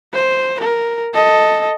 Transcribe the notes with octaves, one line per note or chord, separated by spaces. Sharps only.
C5
A#4
A4 D#5